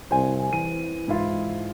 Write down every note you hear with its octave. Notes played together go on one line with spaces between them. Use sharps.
C2 C5 G#5
E3 D#7
G#2 E4 F4